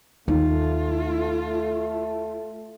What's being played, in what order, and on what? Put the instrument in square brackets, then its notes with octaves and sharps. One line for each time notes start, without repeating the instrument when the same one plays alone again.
[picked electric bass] D#2 [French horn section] A3 [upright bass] D#4 [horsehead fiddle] F4